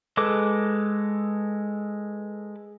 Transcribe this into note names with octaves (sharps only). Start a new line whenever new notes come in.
G#3 A4 B4 D6